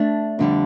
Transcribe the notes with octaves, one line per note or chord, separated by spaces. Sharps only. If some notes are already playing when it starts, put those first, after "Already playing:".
Already playing: A3 D4
F2 D3 G3